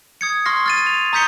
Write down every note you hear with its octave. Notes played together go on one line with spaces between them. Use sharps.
D#6 G#6 C#7
C6 C#6 F6 A#6 C7
F6 A6 D#7
F7
A#5 D#6 G6 B6 C#7 G7